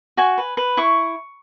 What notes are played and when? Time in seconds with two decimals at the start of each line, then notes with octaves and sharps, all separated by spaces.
0.17 F#4 G#5
0.38 B4
0.57 B4
0.77 E4 C#6